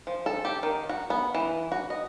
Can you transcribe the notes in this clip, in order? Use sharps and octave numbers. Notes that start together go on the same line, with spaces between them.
F3
A4
G4
D#3
F#4
B3
E3
F#4
D#5